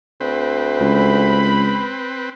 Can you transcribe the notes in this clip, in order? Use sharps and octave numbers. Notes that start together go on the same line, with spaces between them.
D2 C4 B4
C#2 B5